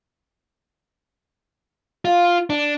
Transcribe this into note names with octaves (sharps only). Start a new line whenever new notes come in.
F4
D4